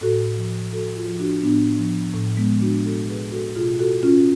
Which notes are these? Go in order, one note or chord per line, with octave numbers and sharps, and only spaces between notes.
A2 F#4 A4
F3
A2 F#4 A4
F4 G#4
F3
D4 F#4
A2 B3 D4
F3
A2
G#3 B3
F3
D4 F#4
B2 F#4 A4
G#4 B4
F#4 A4
B2 F4 G#4
F#4 A4
C#4 F4